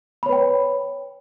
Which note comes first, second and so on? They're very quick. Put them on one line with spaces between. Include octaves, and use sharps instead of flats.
B5 C#5 B4 G5